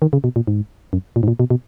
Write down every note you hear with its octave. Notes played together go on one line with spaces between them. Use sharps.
D#3
C#3
B2
A#2
G#2
F#2
A#2
G#2
A#2
B2
B2